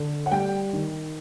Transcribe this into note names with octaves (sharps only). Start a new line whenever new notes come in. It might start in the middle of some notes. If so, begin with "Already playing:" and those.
Already playing: D3
F#5
G3 G5
D#3